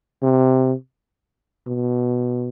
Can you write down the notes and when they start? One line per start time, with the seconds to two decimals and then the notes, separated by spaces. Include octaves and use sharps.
0.23 C3
1.67 B2